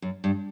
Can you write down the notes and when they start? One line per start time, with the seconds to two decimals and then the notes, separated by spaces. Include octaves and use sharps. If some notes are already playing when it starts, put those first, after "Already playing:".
0.02 F#2
0.24 G2